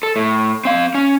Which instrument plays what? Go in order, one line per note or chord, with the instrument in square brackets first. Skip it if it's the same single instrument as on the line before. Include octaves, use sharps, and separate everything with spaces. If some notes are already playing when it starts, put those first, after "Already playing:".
[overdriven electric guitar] A4
A2
C4 F5
C#4